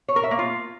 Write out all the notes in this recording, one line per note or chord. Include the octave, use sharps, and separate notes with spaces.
C#5
A#4
E5
A#3
F4